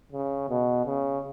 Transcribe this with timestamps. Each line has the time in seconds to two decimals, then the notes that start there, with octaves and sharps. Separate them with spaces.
0.12 C#3
0.49 B2
0.86 C#3